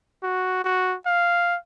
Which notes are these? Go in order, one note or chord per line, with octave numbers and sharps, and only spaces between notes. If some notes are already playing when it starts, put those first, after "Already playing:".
F#4
F#4
F5